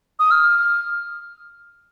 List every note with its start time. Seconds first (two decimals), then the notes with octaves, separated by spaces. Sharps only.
0.19 D#6
0.31 F6